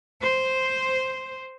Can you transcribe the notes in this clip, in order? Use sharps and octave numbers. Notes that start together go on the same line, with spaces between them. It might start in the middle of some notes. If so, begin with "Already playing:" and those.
C5